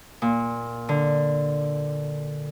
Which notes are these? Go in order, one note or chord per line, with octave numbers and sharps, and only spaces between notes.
A#2
D3